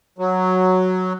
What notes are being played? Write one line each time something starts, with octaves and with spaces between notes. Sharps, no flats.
F#3